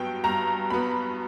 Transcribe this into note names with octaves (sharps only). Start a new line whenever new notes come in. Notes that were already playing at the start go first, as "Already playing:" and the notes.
Already playing: G2 F#3 B3 G5
G2 A#5
F#3 B3 B5